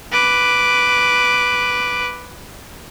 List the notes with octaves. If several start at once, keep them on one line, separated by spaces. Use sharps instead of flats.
B4 D6